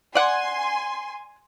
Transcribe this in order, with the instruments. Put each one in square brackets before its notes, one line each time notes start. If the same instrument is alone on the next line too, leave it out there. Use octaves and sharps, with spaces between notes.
[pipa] D5 F#5 [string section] G#5 C6